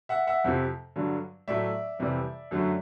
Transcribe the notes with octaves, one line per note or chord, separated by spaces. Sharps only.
E5 F#5
E5 F#5
F2 C3 F3
G2 D3 F#3
A2 F#3 A3 D5 E5
F2 C3 E3 G3
F#2 D3 F#3 A3